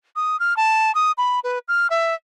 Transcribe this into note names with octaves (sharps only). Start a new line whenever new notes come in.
D#6
F6
A5
D#6
B5
B4
F6
E5